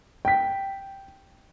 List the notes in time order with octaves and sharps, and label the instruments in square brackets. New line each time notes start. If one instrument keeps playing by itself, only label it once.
[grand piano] G5 B6